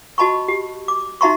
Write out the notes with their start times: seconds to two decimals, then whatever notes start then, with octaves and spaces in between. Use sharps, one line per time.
0.18 F#4 D#5 A5 B5 C#6
0.48 G4
0.88 D6
1.21 D#4 F#4 E5 A#5 C6 C#6